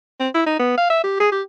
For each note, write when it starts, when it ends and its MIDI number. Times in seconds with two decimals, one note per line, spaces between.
0.20 0.29 60
0.34 0.46 64
0.46 0.59 63
0.59 0.76 59
0.77 0.86 77
0.90 0.99 76
1.04 1.16 67
1.20 1.28 68
1.32 1.42 67